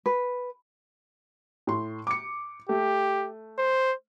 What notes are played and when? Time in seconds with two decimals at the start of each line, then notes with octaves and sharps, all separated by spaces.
0.06 B4
1.67 A2 C6
2.07 D6 C#7
2.69 A3 G4
3.58 C5